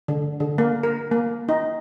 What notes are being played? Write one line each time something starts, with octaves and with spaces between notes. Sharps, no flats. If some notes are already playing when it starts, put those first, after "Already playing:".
D3
D3
A#3
A#4
A#3
D#4